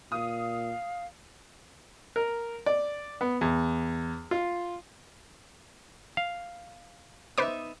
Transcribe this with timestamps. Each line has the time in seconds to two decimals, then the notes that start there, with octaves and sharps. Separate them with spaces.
0.12 A#2 F5 D#6
2.16 A#4
2.66 D5
3.21 B3
3.41 E2
4.31 F4
6.17 F5
7.38 B3 D#4 B4 C5 E5 D6